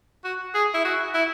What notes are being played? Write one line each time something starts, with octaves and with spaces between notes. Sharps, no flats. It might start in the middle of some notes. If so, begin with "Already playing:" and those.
F#4
G#4
E4
F#4
E4